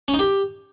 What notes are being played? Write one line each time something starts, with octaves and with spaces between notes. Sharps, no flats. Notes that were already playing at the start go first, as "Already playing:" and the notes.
C#4
D#4
G4